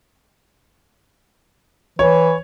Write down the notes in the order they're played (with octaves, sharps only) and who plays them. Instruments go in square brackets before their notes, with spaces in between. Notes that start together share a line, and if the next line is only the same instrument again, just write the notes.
[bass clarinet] E3 [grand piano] C#5